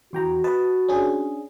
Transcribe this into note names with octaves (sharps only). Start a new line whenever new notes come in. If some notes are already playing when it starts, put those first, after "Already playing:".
E2 F#4 G5 A#5
B4 D#5 A5
C#4 D4 G#4